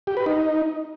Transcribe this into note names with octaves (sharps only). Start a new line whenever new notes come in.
G4
B4
D#4